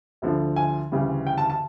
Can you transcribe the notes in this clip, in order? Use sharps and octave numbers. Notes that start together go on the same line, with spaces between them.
D2 D3 F3
G#5
D2 C#3 E3 G3
G5
A5
A5